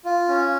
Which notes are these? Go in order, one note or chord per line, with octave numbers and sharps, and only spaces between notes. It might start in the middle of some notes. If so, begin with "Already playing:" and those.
F4
C#4